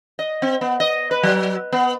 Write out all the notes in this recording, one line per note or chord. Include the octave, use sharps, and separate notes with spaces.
D#5
C4
B3
D#5
B4
F#3
B3